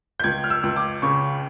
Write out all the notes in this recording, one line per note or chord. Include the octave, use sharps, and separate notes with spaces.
G6
C#2 G#6
F6
E6
C#2
D6
C#3 C#6